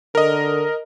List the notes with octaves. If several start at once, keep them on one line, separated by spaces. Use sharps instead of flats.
D3 A#4 D#5